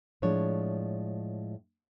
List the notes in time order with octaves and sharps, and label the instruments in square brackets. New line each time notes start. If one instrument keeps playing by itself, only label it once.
[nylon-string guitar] A2 F3 G#3 D4 C#5